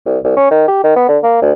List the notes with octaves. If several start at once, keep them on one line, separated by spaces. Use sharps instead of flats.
C2
C2
C#4
D#3
G4
D#3
B3
D3
A#3
D2